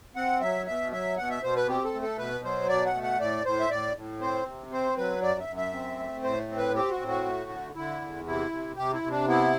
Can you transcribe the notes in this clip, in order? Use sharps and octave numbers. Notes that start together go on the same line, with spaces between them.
C4 F#5
F#3 E5
B2 E5
F#3 E5
B2 F#5
E5
B2 C5
B4
C4 G4
A4
A3
A4
B2 B4
F#3 C5
B2 D5
F#5
A3
F#5
A2 D5
A2 C5
E5
A2 D5
A2
C4 C5
C3
C4 C5
F#3 B4
F#2 D5
E5
F#2
E5
C4
A3
A2 C5
C4
B4
C4 G4
F#4
A2
F#4
A3
D3
D3 E4
E2
C3 E4
C3
C3 G4
E4
C3
D4
B3 E4